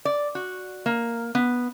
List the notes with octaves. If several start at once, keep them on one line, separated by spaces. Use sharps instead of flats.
D5
F#4
A#3
B3